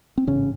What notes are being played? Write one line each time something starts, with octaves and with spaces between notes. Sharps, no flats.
C4
A1 G#2 C#3 C#4